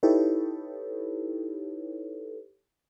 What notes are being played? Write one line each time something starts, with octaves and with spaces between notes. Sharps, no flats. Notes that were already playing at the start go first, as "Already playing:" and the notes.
D#4 E4 G4 A4 B4 C#5